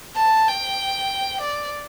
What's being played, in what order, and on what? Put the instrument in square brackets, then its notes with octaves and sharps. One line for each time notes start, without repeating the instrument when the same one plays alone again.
[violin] A5
G5
D5